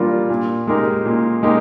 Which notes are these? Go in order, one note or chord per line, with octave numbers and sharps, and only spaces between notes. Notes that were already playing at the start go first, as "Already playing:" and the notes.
Already playing: A#2 G3 D4 F4 A#4
A#2
G#3 D#4 G4 A#4
A#2
G#3 D#4 G4 A#4